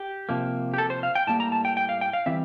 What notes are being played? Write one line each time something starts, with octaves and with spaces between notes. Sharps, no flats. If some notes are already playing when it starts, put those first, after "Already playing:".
Already playing: G4
C3 F3 A#3
G4
A4
C5
F5
G5
A2 G3 A#3 A5
A#5
A5
G5
G5
F5
G5
F5
E3 G3 C4 E5